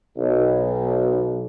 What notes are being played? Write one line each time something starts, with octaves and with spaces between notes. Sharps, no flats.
B1